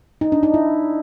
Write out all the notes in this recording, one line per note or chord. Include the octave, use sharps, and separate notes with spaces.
D#4
D4
D#4
E4